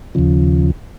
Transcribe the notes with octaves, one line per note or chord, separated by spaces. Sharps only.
D#2 C#3 F3